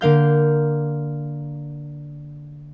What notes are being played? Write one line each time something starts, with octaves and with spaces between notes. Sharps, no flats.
D3 A#3 F5 G6